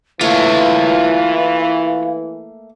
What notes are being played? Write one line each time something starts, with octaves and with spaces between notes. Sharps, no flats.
E3 A3 A#3 F4 C#5 F5